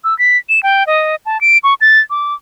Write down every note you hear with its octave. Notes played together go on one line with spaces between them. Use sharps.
E6
B6
E7
G5
D#5
A5
D7
C#6
A6
D6